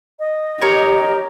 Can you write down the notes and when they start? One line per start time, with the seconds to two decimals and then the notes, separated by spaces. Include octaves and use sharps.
0.19 D#5
0.61 G4 A#4 C#5